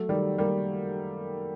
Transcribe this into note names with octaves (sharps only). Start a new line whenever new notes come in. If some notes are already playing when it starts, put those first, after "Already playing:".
Already playing: F#3 A3
D#3 G3
G3 A#3